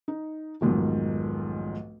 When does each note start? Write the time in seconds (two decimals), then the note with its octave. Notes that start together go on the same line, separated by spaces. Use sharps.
0.08 D#4
0.61 F1 B1 G#2 D#3 F3